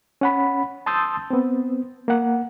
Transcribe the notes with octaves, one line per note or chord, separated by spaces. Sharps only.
C#4 F#5 B5
A5 C6 D#6 E6 G6 A6
B3 C4
A#3 F#5